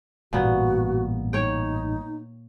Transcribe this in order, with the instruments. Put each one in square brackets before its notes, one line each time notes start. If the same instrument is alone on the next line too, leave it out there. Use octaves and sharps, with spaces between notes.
[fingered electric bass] A1 G2 [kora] A#2 B3 [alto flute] F#4
[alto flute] D#4 [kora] C#5 G5